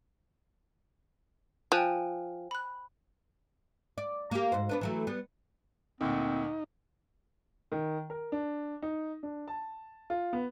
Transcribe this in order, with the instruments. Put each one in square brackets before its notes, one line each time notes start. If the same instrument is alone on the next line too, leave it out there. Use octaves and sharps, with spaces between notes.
[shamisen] F3 [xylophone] G5 G#5 F#6
[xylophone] B5 F#6
[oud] D5
A#3 G4
G#2 F#4 C5
B3 D4 B4
E3 F#3 A3
G3 B3
[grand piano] D2 A#2 [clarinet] C4 [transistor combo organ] D#4
[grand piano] D#3
A#4
D4
D#4
D4
A5
F4
B3